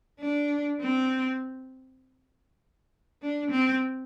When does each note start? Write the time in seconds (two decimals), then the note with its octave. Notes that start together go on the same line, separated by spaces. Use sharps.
0.20 D4
0.81 C4
3.22 D4
3.51 C4